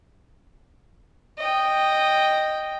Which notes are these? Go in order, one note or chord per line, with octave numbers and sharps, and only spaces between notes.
D#5 G5